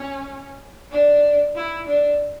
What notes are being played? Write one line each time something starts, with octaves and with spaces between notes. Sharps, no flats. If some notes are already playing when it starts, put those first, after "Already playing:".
Already playing: C#4
D4
E4
D4